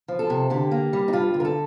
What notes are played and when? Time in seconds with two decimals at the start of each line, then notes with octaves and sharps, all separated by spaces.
0.08 F3
0.19 A4
0.30 C3
0.50 D3 G4
0.71 A#3
0.93 G3
1.08 D#4
1.13 G2 F4
1.34 D3
1.40 A#4
1.45 A4